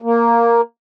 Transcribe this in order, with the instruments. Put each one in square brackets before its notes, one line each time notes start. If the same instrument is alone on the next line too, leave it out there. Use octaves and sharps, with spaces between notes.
[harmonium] A#3